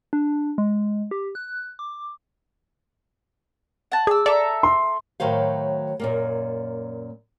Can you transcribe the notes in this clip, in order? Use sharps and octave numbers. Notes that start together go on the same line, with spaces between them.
D4
G#3
G4
F#6
D6
F#5 A5
G#4 D5 E6
A4 D5 E5 A#5
C6
A2 D#3 F#3 C5 F5
F#2 A#2 A#3